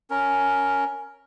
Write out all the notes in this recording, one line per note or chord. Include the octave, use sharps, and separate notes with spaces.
C#4 A#4